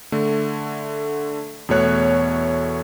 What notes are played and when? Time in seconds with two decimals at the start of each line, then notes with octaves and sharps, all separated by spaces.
0.12 D3 A3
1.69 E2 B2 A3 C#5 F#6